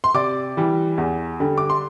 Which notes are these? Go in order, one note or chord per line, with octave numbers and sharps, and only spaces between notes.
C6
C3 D5 D6
E3 G3
E2
D3 G3
D6
C6